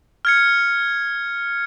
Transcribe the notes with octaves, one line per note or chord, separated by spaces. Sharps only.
F6 G#6 C#7